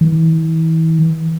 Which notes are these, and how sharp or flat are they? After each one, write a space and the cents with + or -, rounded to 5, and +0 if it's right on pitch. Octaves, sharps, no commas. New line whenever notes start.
E3 -35